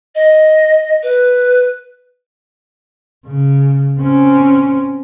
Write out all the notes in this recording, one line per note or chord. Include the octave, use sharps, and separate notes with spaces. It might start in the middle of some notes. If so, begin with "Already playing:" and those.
D#5
B4
C#3
C4 C#4